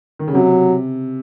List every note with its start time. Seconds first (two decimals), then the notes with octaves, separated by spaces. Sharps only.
0.19 D#3
0.28 C#3
0.34 C3 F#3